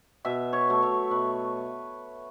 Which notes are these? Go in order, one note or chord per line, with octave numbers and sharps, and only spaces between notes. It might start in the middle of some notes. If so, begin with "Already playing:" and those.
B2 E5
C#5
F#3 A3
C#5
B2 B4